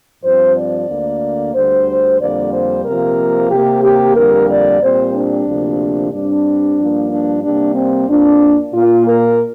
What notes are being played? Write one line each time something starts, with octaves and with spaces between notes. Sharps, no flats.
G2 F3 C4 C5
D5
D2 D3 A#3
D2 D3 G3 C5
F2 D3 G3 A#3 D5
C5
C3 F3 A#3 A#4
C3 A#3 G4
G4
F2 D3 G3 A#3 A#4
D5
A#2 G3 C4 C5
D4
D2 C3 F3 A#3
G2 G3 C4 D4
G2 F3 A#3
D4
C3 G3 A#3 D4
C4
F2 F3 A#3 D4
A#2 A#3 F4
A#4